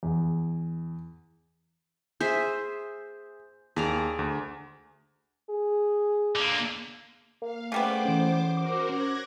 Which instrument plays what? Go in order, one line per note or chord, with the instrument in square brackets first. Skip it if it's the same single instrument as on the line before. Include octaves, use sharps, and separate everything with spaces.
[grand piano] E2
[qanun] G#4 C5 E5 [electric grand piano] G6
[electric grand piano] D#2 [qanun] G#4 D5 A#5
[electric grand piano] D2
[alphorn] G#4
[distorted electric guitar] D3 A#3
[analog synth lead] A#3 [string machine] F5
[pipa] C#3 G3 B3 [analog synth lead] A3 [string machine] C5 D6
[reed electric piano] E3 C#4
[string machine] F#4 A#4 C5 [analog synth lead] D6
[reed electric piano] C#4 [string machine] F#6 G#6 A#6